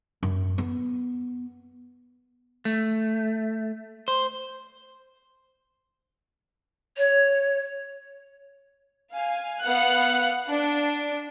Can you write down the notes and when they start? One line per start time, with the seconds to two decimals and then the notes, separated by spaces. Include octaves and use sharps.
0.23 F#2
0.58 B3
2.65 A3
4.08 C5
6.97 C#5
9.13 F5 G#5
9.64 B3 F5 F#5 F#6
10.47 D4